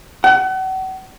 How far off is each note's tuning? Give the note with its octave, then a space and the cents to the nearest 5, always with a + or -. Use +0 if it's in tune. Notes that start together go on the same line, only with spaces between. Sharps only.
F#5 +35